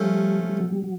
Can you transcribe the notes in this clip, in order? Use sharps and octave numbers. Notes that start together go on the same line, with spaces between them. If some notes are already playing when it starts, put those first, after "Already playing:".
Already playing: F3 G3 A3 C#4
G3
F#3
G3
F#3